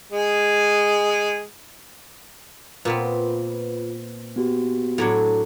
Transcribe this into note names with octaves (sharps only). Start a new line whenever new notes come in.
G#3 G#4
A#2 B3 C4 F4 B4
B3 F#4 G4
A2 F#3 D4